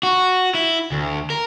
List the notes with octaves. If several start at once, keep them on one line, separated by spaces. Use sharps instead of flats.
F#4
E4
D2
A#4